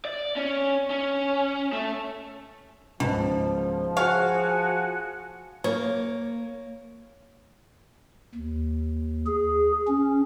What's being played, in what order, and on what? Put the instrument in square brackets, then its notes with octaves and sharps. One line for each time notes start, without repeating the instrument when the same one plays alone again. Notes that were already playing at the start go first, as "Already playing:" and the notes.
[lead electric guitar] D5
C#4
C#4
A3
[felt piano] C#2 G#2 A5 [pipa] B2 [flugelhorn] F3
[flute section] F#4 G#5 [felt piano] G#4 C5 [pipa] C#5 F5
[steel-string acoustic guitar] A#3 [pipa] C#5
[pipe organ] D#2
G#4
C#4